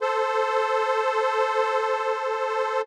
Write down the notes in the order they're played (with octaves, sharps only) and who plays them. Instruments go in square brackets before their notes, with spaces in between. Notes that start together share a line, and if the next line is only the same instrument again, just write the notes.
[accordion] A4 C5